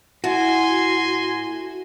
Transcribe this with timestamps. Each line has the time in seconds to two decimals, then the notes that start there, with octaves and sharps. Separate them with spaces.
0.24 A2 F#4 G#5 C6